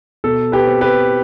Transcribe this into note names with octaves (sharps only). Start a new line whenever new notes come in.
B2 A4
G4 B4
C4
G4 B4